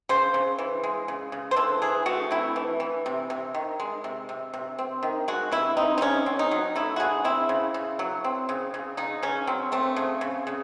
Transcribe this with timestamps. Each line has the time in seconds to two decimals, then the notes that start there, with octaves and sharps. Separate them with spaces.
0.09 C#3 C5
0.34 C#3
0.59 E3
0.84 G#3
1.08 C#3
1.32 C#3
1.51 C5
1.56 E3 A4
1.82 E3 G#4
2.06 A3 F#4
2.31 C4 E4
2.56 E3
2.80 E3
3.06 C3
3.30 C3
3.54 D#3
3.80 G#3
4.04 C3
4.29 C3
4.54 C3
4.79 C4
5.03 D#3
5.28 G#3 F#4
5.52 C3 E4
5.77 C4 D#4
5.98 D#4
6.01 C#3 C#4
6.26 C4
6.39 D#4
6.51 F#3
6.76 A3 E4
6.96 F#4
7.00 C#3 G#4
7.24 C4 E4
7.49 C#3
7.74 C#3
7.99 F#3
8.24 C4
8.49 C#3
8.74 C#3
8.97 C#3 D#4
9.23 C#3 C#4
9.47 F#3 C4
9.72 A3 C4
9.96 C#3
10.21 C#3
10.47 C#3